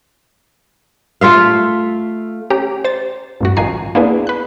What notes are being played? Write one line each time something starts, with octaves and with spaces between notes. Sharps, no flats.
A3 F4 E5 F5
C#4 G4 A#5
C5 A6
A1 G2 F#4
A1 D#3 F3 G#5 A#5 C7
A#3 B3 D4 E4 G#4 B4
B4 F#6